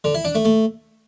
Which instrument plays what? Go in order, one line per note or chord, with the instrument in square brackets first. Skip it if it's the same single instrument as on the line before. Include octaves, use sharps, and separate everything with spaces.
[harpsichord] D3
E4
D4
A3
A3